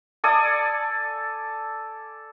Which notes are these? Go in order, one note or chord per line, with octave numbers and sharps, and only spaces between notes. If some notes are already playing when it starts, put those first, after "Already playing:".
A4 D5 G#5 D#6